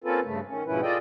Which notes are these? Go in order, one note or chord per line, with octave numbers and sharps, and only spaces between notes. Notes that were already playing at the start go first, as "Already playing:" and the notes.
A#3 C4 C#4 F4 A4 B4
G2 C#3 A3
D#3 C#4
G#2 B2 F3 C#4 E4 B4
F4 G#4 A4 D5 D#5 G5